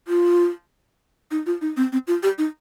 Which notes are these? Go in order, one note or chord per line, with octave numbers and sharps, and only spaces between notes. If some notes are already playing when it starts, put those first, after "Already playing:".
F4
D#4
F4
D#4
C4
C4
F4
G4
D#4